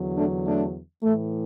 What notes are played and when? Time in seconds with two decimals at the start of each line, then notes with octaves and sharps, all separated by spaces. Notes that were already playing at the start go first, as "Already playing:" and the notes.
Already playing: E2 D3 F#3
0.16 A3 D4
0.45 A3 D4
1.02 A2 E3 A3